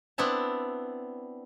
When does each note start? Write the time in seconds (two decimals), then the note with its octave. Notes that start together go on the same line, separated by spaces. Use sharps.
0.18 B3 C4 D4 E4 A5